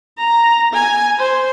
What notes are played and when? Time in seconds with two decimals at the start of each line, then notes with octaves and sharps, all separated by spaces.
0.18 A#5
0.73 G#5
1.19 C5